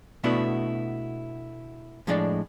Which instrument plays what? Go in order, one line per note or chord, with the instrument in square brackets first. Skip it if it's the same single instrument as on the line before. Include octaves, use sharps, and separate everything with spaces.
[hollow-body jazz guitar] B2 A3 B3 D4 E4 F#4
A2 F3 G#3 D4 D5